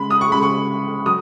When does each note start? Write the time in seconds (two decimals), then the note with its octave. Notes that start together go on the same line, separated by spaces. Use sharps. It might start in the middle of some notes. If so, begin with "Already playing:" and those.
Already playing: C#3 G#3 B5
0.10 D#6
0.21 C#6
0.30 C#3 G#3 B5
0.42 C#6
1.06 F#3 D#6